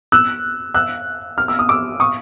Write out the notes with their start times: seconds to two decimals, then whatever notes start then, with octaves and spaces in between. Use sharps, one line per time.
0.12 E6 F#6
0.74 E6 F#6
1.38 F6
1.48 E6
1.59 D#6
1.69 D6 E6
2.00 C#6 D#6